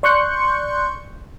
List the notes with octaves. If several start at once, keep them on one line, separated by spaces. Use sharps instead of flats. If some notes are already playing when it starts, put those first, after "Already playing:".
D5 C6 C#6 F#6 G6 C#7